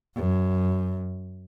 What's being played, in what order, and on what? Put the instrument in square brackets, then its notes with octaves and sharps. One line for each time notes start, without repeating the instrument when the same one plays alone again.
[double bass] F#2